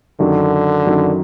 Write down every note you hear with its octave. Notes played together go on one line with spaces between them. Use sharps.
F#2 D3 D#3 F#3
F#2 D#3 F#3